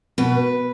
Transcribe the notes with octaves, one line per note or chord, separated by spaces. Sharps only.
B2 B4